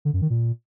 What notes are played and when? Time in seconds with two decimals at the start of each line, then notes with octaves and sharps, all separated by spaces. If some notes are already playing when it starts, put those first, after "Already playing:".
0.05 D3
0.13 F#2
0.22 D#3
0.30 A#2